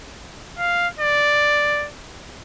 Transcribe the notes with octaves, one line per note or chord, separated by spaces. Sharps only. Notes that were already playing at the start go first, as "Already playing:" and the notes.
F5
D5